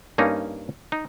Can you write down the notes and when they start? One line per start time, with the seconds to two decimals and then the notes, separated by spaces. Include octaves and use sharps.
0.18 G2 A#3 C#4 D#4
0.92 D#4